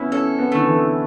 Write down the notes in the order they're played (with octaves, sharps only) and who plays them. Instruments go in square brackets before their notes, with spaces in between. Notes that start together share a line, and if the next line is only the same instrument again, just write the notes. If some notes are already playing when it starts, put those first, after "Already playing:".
Already playing: [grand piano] B3 C#4 [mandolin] E4
[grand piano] C#4 [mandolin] A4
[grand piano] B3
[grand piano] D3 [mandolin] A3
[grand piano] E3